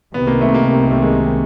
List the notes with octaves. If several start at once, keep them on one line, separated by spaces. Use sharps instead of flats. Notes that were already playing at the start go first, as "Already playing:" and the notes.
C2 C3 D#3 B3
A#3
A3
A#3
A3
G#3